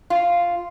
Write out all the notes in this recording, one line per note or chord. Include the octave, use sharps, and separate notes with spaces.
F4